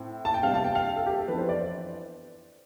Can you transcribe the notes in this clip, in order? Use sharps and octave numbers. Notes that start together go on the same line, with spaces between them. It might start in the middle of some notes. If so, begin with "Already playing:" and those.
Already playing: A2 C4
A5
G5
C3 G3 B3 D4 F5
A5
G5
F5
A4
G4
A4
F2 E3 B3 D4 B4
C5
D5
C5